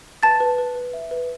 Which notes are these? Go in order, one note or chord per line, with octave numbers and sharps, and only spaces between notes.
B4 A5 A6
B4
B4
B4
E5
B4